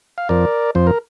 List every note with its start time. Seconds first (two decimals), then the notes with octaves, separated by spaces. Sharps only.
0.18 F5
0.29 F2 F3 A#4 D5
0.75 F2 F3 C5
0.87 A#4